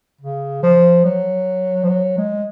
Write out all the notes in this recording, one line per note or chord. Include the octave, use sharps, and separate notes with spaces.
C#3
F3
F#3
F3
F#3
G#3